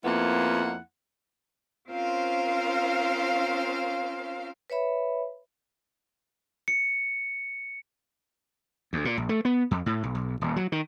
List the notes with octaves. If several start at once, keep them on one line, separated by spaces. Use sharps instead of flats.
F2 A#3 B3 E4 F#5
C4 C#4 F4 A#4 C5 F5
B4 C#5 E5 B5
C#7
D2
A#2
A#1
A3
B3
F2
A2
B1
B1
D#1
F#3
D#3